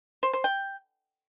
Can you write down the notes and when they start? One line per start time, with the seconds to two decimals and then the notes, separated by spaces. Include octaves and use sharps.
0.23 C5
0.33 C5
0.44 G5